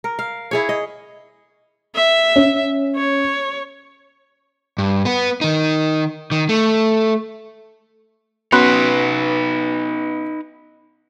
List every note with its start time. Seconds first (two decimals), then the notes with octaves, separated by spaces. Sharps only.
0.04 A#4
0.19 F5
0.51 E4 G#4 C#5
0.69 D#5
1.95 E5
2.36 C#4
2.96 C#5
4.78 G2
5.05 B3 B4
5.41 D#3 D#4
6.32 D#3
6.49 A3
8.52 B3 C#4 D#4 F#4 B4 B5 C6 F#6